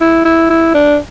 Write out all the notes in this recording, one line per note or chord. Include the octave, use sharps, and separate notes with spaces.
E4
E4
E4
D4